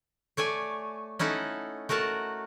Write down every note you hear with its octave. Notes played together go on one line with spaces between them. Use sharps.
A3 C#5 D5 G#5
C#4 D#4 E4 A4 F#5
A3 F#4 A#4 F#5 A5